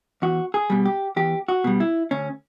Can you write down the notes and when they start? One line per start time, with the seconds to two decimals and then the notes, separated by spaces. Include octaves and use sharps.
0.22 E2 F#4
0.54 G#4
0.70 B2 G3
0.85 G4
1.16 E2 G4
1.48 F#4
1.64 B2 G3
1.80 E4
2.11 D2 C#4